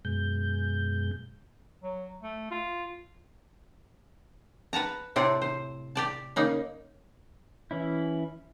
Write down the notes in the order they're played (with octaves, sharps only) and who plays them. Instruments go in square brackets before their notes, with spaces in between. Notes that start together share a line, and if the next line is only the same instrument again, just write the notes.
[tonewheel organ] F#2 B2 G#3 G6
[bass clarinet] F#3
A3
F4
[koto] B4 F#5 A5 A#5
A2 C3 C4 D5 F#5
C5
G4 D5 A5
C#3 A#3 D#4
[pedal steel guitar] E3 C#4 E4